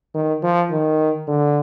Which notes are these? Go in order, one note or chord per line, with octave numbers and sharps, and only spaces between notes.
D#3
F3
D#3
D3